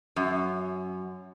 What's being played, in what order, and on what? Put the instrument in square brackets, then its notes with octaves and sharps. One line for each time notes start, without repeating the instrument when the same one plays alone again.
[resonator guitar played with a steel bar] F#2